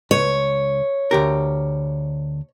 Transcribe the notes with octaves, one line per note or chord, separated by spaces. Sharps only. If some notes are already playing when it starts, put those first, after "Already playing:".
C#2 C#5
D2 G4 A#4